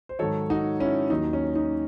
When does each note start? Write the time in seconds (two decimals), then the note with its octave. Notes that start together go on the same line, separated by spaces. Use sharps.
0.09 C5
0.19 G#2 D#3 F#3 A4 C#5
0.50 D#4 F#4
0.80 C#4 E4
1.10 D#2 D#3 F#3 D#4
1.33 C#4
1.55 D#4